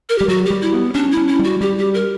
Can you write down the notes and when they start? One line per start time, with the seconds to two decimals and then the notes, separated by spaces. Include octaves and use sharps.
0.09 A#4
0.18 G3 G4
0.28 F#3 F#4
0.45 G3 G4
0.62 E4
0.73 B3
0.95 C#4 D4
1.11 E4
1.17 C#4
1.28 E4
1.39 G3 F#4
1.61 G3 G4
1.78 G4
1.94 A#4